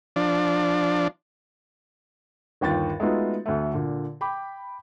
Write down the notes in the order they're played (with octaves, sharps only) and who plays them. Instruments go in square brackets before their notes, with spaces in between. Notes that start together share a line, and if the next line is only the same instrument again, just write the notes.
[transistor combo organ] F3 D4
[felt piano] G1 D#2 F4 G5 A6
G#3 A3 B3 D#4 F4 F#4
D2 A3
A#2 D3
G5 B5 D6